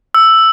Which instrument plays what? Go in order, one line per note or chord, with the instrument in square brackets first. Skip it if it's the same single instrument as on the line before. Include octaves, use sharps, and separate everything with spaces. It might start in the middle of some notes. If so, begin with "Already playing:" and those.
[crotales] E6